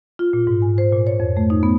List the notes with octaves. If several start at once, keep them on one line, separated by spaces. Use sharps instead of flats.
F4
A#2
G#2
G#5
C5
A#2
C#5
F2
A3
D#4
B3